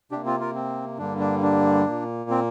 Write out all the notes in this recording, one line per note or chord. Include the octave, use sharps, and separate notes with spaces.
C3 A#3 D4 G4
C4 F4
F4 A#4
C4
G2 D3 G3 A#3 D4
D4
D4
A#2 A#3
C4